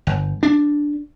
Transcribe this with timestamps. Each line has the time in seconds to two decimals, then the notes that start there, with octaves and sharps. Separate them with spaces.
0.07 G1
0.43 D4